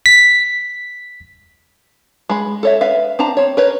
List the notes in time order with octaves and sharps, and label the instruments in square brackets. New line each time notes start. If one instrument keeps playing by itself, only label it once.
[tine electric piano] B6
[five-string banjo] G#3 B5
A4 C#5 E5
B4 E5 F5
C4 D4 A5 A#5
C4 C#5
A#4 B4 C#5